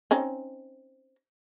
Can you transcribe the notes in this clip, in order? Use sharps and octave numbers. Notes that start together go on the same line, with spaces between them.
C4 C#4 D#4